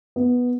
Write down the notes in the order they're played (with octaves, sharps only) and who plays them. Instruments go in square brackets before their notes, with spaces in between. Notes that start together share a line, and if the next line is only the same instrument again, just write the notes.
[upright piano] B3